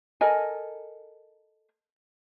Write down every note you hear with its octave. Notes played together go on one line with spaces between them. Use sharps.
A4 A#4 D#5 G#5